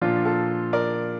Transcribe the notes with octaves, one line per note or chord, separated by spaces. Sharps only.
A#2 F3 D4 F4
F4 A4
A#4 D5